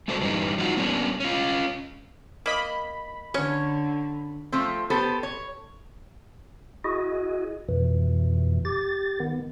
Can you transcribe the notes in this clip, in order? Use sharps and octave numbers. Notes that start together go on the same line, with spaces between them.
G#3 A3 D4 F#4 A4 C5
G2 E3 G3 C#4 D#4
F3 F#3 G#3 D#4 F4 F#4
G3 A#3 B3 C#4 D4
C#4 F4
A#3 D#5 B5
D3 C#4 C#5
F3 A3 C4
B3 G4 A4 C5
C#5
E4 F#4 G#4 D#5
F2 B2 E3
G4 A6
D#3 B3